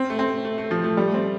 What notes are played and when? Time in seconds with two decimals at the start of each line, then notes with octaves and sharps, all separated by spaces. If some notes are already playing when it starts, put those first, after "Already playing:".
Already playing: C4
0.10 A3
0.19 C4
0.45 A3
0.58 A3
0.71 F3
0.84 A3
0.97 G3
1.07 A3
1.14 C4